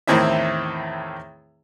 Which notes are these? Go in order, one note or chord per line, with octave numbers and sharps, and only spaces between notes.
E2 A2 D#3 C4 E4 E5